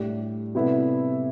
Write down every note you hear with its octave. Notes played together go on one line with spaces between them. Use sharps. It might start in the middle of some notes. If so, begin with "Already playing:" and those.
Already playing: A2 G3 D4 G4
C3 G3 B3 E4 A4